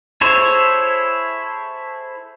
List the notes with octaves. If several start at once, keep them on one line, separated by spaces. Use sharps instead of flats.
E4 G#4 A4 C5 C#5